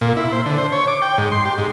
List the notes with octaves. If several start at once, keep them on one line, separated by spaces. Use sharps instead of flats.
A#2
E4
C5
D3
C5
C#5
D6
G5
G#2
C6
G4
G#2